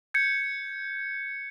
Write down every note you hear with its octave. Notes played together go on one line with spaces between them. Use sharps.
G6 G#6 C#7